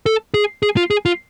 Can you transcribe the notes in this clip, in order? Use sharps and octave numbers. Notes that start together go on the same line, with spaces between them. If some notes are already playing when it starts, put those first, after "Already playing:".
A4
G#4
G#4
F4
G#4
F4